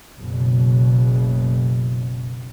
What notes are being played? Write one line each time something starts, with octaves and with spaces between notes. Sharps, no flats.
F#1 B2